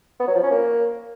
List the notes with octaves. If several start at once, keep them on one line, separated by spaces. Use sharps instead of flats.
B3
F#3
F3
C#4
A#3